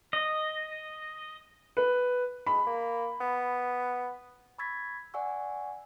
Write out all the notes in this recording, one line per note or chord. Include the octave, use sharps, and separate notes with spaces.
D#5
B4
G#3 B5
A#3
B3
B5 C#6 E6 G#6 A6 B6
D5 F#5 G#5 C#6 E6